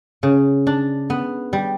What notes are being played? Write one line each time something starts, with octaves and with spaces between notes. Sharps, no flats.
C#3
D4
B3
G3